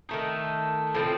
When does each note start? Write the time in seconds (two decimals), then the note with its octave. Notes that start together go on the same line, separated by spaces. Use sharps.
0.09 D#3 A3 D#4
0.95 A2 F3 C4